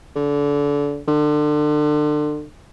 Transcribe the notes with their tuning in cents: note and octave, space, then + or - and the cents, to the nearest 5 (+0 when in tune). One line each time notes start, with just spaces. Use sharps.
D3 -25
D3 +30